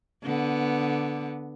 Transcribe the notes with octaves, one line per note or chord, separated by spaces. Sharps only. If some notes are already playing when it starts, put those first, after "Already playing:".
D3 B3